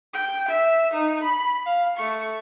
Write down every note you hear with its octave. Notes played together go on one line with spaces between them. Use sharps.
G5
E5
D#4
B5
F5
A3 C#6